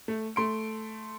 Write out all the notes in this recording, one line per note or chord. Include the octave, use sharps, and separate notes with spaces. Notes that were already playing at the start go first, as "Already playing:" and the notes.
A3
A3 C6 D7